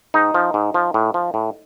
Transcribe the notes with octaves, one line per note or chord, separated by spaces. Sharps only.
G#2 D#4
F3
G#2
F3
A2
F3
A2